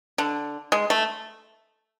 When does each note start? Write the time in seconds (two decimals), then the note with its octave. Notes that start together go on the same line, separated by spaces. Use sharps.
0.18 D3
0.72 G#3
0.90 A3